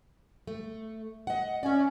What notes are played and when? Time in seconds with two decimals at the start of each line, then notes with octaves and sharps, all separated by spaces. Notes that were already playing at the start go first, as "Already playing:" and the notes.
0.47 A3
1.27 D#5 F#5
1.63 C#4 D5 E5